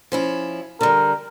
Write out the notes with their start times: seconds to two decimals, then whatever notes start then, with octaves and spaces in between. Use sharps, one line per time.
0.12 F3 C#4 E4
0.81 D3 G3 A#4